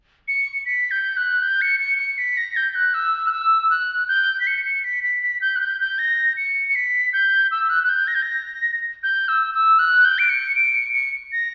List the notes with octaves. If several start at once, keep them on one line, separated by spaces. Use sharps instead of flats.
C#7
B6
G6
F#6
G6
C#7
C#7
C#7
B6
A#6
G6
F#6
E6
F#6
E6
F#6
G6
B6
C#7
C#7
B6
B6
B6
G6
F#6
G6
G6
A#6
C#7
C#7
B6
G6
E6
F#6
F#6
G6
A#6
G6
A#6
G6
E6
E6
F#6
G6
D7
C#7
D7
C#7
C#7
A#6